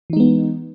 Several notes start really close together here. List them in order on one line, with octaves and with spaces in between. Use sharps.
E3 D#4 G#3 B3